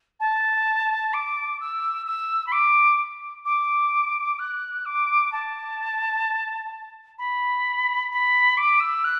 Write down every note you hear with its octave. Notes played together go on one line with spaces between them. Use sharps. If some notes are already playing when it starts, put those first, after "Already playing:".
A5
D6
E6
E6
B5
D6
D6
F#6
D6
A5
B5
B5
D6
E6
F#6